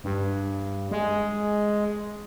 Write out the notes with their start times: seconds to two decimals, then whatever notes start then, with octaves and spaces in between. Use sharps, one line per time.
0.04 G2
0.91 G#3